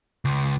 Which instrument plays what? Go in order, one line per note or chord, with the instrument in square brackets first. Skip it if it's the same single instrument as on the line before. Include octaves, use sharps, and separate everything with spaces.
[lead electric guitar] C#2